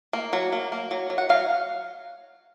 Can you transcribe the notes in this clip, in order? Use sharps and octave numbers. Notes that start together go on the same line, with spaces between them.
A#3
F#3
A#3
A#3
F#3
F#3
F#5
F#3 F5